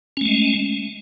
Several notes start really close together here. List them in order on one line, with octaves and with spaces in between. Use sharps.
C#4 A3 G#3